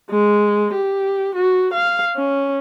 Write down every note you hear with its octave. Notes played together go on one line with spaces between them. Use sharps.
G#3
G4
F#4
F5
C#4